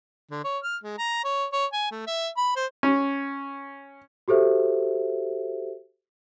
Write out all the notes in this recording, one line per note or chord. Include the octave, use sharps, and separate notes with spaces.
D3
C#5
F6
G#3
A#5
C#5
C#5
G#5
A3
E5
B5
C5
C#4
F#4 G4 A4 C5 E5